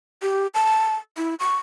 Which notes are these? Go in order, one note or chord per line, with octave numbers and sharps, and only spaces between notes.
G4
A5
E4
C#6